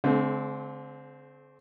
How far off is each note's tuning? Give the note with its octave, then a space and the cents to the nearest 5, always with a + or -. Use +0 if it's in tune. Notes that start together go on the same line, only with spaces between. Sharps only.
D3 -40 G#3 +40 C4 -15